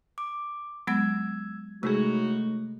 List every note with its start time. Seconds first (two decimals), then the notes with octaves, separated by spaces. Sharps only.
0.18 D6
0.87 F#3 G#3 B3 E6 G#6
1.83 A2 C3 G#3 A3 D#4 F#4 G#4